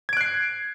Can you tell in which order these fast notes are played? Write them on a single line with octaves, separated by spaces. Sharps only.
G#6 D7 F#6 C7